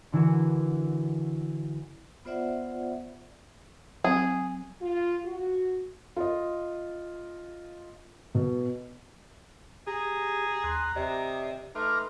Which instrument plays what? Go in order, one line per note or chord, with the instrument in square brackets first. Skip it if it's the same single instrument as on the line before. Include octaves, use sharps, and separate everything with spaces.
[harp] D3 E3 D4 E4 F#4 A#4
[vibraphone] B3 F4 C5 D5 E5 F#5
[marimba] F#3 C4 [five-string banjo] G#4
[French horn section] F4
F#4
[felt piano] F4 D#5
B2
[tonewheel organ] G4 [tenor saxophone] G#4 [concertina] A#5
[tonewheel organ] D#2 C6 F#6
[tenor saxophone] C3 [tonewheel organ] D5 D#5
[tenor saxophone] A3 [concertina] D#4 B4 C6 [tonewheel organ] A#5 D6 F6